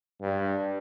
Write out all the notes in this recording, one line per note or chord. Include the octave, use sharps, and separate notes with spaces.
G2